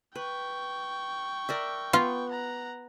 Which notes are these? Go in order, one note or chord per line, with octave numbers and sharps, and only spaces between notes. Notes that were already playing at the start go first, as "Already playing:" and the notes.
B4 G5 C#6
A#4 D5 E5
B3 F4
F#5 A#5